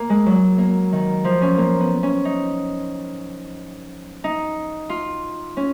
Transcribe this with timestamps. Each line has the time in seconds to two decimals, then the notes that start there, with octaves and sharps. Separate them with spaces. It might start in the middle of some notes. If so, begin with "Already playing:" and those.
Already playing: A#3
0.10 G#3
0.26 F#3
0.58 A#3
0.92 D#3
1.24 F3
1.42 C#4
1.58 A#3
1.81 B3
2.03 C#4
2.25 D#4
4.24 D#4
4.89 F4
5.57 C#4